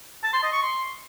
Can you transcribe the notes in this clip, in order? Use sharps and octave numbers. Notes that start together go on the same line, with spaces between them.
A5
C6
D#5
C#6
C6